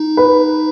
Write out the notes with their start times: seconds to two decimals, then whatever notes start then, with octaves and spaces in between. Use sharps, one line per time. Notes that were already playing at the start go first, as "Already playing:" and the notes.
Already playing: D#4
0.17 B4